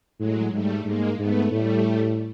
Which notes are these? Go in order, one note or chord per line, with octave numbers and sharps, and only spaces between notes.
A2 F#3 G#3
G#2 G3 A3
G#2 G#3 A#3
G#2 A3 B3
A2 G3 A3